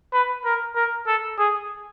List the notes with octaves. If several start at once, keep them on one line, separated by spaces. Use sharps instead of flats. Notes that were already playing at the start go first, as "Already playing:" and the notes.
B4
A#4
A#4
A4
G#4